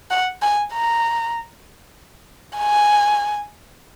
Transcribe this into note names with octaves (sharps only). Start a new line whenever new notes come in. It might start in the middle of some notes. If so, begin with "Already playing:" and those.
F#5
G#5
A#5
G#5